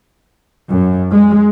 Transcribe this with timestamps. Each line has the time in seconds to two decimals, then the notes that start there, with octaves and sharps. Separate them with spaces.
0.70 F#2
1.11 G#3